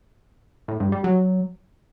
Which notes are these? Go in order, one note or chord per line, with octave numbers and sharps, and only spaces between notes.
A2
G2
G3
F#3